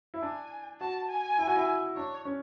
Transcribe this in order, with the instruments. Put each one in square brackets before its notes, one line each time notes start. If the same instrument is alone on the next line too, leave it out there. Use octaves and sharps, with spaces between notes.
[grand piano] E4
[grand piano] D4 [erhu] G#5
[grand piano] F#4 [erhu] A5
[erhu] G#5
[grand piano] E4
F#4
E4
[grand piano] D4 [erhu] C#5
[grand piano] C#4